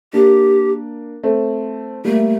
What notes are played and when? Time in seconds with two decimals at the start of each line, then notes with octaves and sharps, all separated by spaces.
0.13 A#3 D4 G4
1.23 A3 C4
2.05 G3 A3 A#3